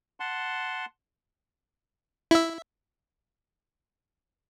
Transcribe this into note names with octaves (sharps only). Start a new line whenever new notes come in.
F#5 A5 C6
E4 E5